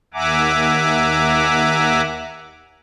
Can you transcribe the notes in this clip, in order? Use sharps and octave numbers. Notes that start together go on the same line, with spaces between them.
D#2 E5 F#5 G#5 A#5 D6